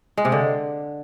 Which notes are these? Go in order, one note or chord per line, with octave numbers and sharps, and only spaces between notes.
G#3
C3
D3